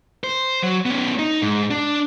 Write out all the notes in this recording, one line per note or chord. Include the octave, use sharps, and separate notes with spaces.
C5
F#3
B3 C#4
D#4
G#2
D4